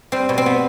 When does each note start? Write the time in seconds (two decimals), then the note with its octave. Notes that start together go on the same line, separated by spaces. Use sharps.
0.12 G3 C4
0.29 B2
0.38 C4
0.46 B3